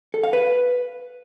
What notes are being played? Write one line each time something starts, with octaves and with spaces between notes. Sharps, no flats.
A4
F5
B4